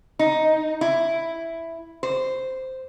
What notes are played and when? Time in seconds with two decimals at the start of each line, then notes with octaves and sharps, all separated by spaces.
0.19 D#4
0.81 E4
2.03 C5